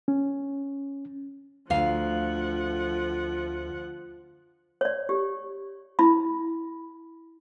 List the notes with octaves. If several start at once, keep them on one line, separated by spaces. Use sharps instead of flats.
C#4
D2 F3 F5 F#5
C#5 D5
G4
E4 B5